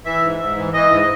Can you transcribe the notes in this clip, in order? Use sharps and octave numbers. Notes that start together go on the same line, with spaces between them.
E3 E5
G#2
G#2
E3
E3 D#5
G#2